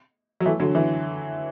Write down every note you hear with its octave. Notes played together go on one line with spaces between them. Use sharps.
F#3
E3 A3
D3 F#3
E3